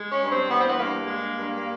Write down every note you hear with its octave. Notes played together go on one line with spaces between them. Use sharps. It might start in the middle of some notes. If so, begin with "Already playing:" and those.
Already playing: G#3
C#4
G2
C4
E3 B3
C4
B3
G2 A#3
G#3
G2